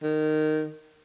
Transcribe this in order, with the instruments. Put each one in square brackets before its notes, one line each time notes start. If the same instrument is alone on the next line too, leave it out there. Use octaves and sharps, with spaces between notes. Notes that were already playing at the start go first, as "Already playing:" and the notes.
[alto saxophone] D#3